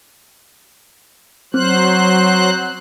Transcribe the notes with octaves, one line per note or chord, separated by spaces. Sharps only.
F#3 C4 C5 F#6